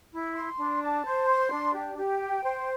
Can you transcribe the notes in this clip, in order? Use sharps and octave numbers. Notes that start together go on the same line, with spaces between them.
E4
C6
D4
A5
C5
C6
D4
G4
G4
G5
C5